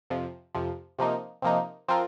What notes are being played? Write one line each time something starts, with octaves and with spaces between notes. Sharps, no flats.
F2 C3 F3
F2 C3 F3
C3 F3 A#3 D#4
C3 F3 A#3 D#4
F3 C4 F4 A#4